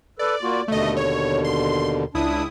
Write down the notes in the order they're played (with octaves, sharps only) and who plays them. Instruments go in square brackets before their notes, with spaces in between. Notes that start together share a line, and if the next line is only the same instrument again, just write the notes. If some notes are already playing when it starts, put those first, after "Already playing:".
[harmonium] A4 B4 [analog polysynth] D5
[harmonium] A#3 F4 F#4
[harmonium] D#2 B2 D3 [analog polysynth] A3 D#5
[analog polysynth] C#5
C6
[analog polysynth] C#2 E4 D#6 [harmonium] D4